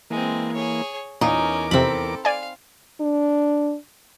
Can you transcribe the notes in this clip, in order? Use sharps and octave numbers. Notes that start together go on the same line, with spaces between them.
E3 G#3 A#3 C4
G#4 C#5
E2 A#2 C#4 D#4 A#4 D6
F2 C3 C4 A4 B5
D5 F5 G#5
D4